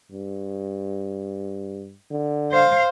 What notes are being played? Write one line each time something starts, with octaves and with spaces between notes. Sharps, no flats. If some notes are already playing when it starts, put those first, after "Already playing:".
G2
D3
C5 F5